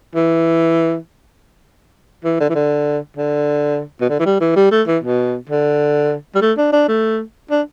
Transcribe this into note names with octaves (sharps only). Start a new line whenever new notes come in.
E3
E3
D3
E3
D3
D3
B2
D3
E3
G3
E3
G3
A3
E3
B2
D3
G3
A3
D4
D4
A3
D4